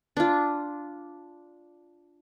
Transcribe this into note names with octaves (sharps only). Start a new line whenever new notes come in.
D4 F4